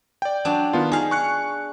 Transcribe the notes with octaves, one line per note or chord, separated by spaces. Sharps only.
D5 G5
F#3 D4
D#3 B3 F4
D#4 G#4 F5
C#6 F#6 C#7